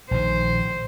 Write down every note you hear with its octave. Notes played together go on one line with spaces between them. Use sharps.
A#1 D#3 C5